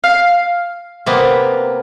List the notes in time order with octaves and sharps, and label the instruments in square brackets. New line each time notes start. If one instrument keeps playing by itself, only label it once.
[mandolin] F5
[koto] C3 A#3 B3